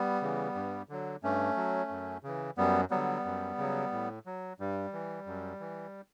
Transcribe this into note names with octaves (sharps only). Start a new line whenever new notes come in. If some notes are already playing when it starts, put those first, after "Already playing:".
Already playing: G3 B3
C#3 E3
G2
D3 F#3
G2 A3 C#4
F#3
F#2
C#3 E3
F#2 G3 B3
D3 F#3 G3 B3
F#2
C#3 F#3
A2
F#3
G2 G3
E3
F#2
E3